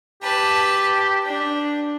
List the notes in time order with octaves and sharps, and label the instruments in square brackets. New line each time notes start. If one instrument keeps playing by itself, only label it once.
[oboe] G4 [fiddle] B4 A5
[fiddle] D4